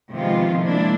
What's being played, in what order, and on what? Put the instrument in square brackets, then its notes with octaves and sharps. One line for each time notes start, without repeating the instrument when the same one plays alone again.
[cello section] C3 D#3 F3 G#3 B3 F4
G#3 A#3 D4 E4